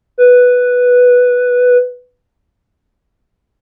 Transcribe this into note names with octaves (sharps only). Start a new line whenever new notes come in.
B4